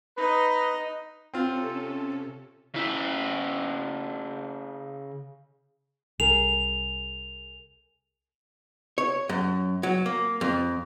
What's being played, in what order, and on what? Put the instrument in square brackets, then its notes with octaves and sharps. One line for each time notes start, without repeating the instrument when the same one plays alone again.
[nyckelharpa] D#4 D#5 [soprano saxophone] B4
[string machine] C3 C#4 A4 [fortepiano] C4 F4
[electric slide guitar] C#3 E4
[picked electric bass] C2 [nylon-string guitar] G#4 A#4 [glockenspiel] F7
[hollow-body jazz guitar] C#5
F#2
F#3
A#3
F2